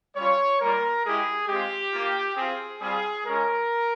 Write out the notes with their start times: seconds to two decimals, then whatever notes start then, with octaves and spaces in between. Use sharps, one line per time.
0.16 G3 C#4 F4 C#5
0.60 G3 A#3 F4 A#4
1.04 G#3 E4 G4 G#4
1.48 G#3 C4 F4 G4
1.93 A#3 F4
2.37 C4 F4 G#4
2.81 G3 C4 F4 G#4
3.26 G#3 C#4 F4 A#4